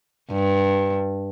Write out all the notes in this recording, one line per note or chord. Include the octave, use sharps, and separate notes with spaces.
G2